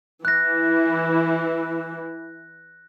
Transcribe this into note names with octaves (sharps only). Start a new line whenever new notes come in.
E3 E4 F#6 A#6